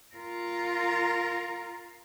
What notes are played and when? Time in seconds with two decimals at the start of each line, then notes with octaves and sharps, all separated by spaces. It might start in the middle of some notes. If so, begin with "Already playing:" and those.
0.15 F4 A#4